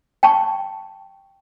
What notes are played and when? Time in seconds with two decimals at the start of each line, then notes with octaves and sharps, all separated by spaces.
0.23 G5 A5 C#6